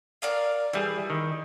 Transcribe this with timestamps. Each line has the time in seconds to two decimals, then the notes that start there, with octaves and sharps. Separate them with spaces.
0.22 A#4 D5 F5
0.73 E3 G3 E4 G#4
1.10 D#3